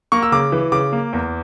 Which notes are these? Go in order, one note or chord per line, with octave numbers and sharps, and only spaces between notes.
A#3 C#6
E6
C#3 D6
E3
C#3 D6
A#3
E2